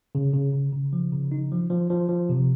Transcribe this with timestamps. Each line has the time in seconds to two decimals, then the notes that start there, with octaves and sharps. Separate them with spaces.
0.15 C#3
0.33 C#3
0.53 C#3
0.72 C#3
0.93 F3
1.12 C#3
1.32 D#4
1.52 F3
1.70 F3
1.90 F3
2.09 F3
2.29 C3